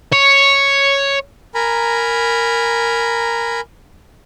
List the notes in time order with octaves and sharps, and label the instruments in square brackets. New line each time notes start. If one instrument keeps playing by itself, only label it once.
[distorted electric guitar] C#5
[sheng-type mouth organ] A#4 G#5 A#5 B5